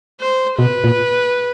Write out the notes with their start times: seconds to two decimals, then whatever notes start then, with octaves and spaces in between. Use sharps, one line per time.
0.21 C5
0.59 B2 B4
0.84 A#2